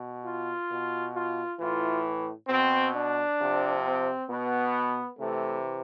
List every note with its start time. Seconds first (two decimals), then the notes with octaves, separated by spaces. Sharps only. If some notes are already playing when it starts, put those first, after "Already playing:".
Already playing: B2
0.25 F4
0.69 B2
1.14 F4
1.58 A2 E3 F4
2.48 B2 C4
2.93 D4
3.38 C3 F3
3.83 C4
4.28 B2 B3
5.17 C3 E3 A3